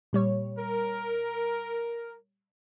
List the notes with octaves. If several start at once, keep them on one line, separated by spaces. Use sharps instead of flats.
A#2 G3 C#5
A#4